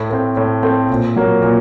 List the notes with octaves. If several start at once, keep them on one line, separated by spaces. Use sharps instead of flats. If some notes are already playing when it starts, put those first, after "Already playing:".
Already playing: A2
A3 C4
A2
A3 C4
A#2
F#3 A#3
A#2